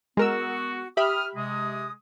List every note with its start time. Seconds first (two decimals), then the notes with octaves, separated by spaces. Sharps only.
0.17 G#3 B3 F#4 A#4 E6
0.97 G4 E5 B5 D#6 F6
1.36 C3 G#3 D#6